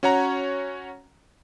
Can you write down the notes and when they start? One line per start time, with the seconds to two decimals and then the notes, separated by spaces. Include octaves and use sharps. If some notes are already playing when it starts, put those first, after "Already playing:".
0.03 C#4 F#4 C#5 F#5 A#5